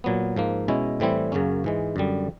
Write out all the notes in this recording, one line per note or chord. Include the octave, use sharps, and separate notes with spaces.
A#2 F#3 B3
G#2 F3 A#3
B2 G#3 C#4 E4
A2 E3 G3 C4 E4
F#2 C#3 F#3 A#3 C#4
G#2 E3 G#3
F#2 D3 G3